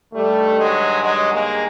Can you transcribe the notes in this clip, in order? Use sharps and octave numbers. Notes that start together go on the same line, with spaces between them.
G2 D#3 G3 A3
F#3 G#3
F#3 G#3
G#3 A#3